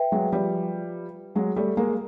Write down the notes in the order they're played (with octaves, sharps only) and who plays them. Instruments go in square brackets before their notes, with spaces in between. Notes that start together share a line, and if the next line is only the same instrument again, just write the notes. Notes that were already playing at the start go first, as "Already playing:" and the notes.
Already playing: [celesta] B4 E5 G5
[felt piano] F#3 G#3
F3 G3
F#3 G#3
G3 A3
G#3 A#3